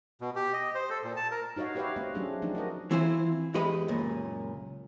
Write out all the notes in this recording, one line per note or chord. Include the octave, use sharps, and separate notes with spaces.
B2
G4
D#5
C5
A4
A#2
A5
A#4
D#4 F#4 C#5 D#5 F5
F#4 G4 B4 C#5 E5 F5
A3 C4 D#5
F#3 A3 C#4 D4 G4 G#4
F3 A3 D4 D#4
F#4 A#4 D#5
E3 C4 E4 F4 C5
E2 G#3 G4 B4 D#5 B5
C#2 F#2 A#2